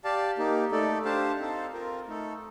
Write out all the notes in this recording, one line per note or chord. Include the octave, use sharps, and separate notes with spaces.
G4 D5 F5 A5
A#3 D#4 G4
A3 D#4 A4 D5
D4 G4 C5 F5 A5
C4 D#4 A4 C5 F5
C4 F4 A#4
A3 D#4 A4